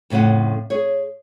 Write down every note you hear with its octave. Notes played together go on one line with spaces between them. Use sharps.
F2 A2 C#3 F4 F#5
G#4 C#5